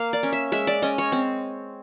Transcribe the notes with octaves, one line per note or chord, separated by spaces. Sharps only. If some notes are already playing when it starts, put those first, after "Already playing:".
Already playing: A#3 F5
D5
C#4
E5
G#3 E5
D5
C#4 D#5
C#5
C4